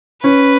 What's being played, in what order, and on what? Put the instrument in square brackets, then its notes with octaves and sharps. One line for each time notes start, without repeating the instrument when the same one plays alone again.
[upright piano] C#4 [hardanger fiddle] B4